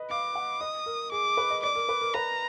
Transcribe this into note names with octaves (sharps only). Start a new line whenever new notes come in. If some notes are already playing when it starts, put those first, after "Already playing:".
Already playing: B4 D#5
F5 D6
F#5
D#5 D#6
A#4
G#4 D6
B4
D#5
D5 D6
A#4
B4
A#4
B4 A#5